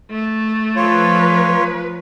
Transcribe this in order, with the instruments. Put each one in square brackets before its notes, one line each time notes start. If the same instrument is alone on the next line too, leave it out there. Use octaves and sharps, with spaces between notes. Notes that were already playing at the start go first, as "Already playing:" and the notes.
[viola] A3
[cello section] F3 B4 [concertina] F4 C#5